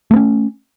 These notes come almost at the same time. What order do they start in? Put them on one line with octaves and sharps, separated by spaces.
A3 B3 C#4